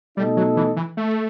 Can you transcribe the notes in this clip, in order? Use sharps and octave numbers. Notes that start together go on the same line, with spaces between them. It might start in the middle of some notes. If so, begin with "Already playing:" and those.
B2 G3 A3 D#4 A4 D#5
F#3
E3
E3
A3